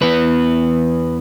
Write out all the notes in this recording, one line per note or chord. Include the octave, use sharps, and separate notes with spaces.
E2 E3 B3 B4